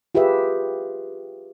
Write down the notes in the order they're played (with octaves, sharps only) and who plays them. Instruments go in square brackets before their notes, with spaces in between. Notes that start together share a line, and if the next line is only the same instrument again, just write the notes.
[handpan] F4 G4 G#4 B4 E5